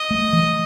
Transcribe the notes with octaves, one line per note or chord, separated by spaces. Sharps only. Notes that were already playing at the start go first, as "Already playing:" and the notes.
Already playing: D#5
A3
E3